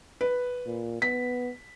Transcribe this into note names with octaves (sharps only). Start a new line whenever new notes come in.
B4
A#2
B3 B6